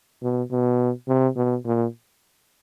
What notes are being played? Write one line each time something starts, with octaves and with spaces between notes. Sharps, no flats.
B2
B2
C3
B2
A#2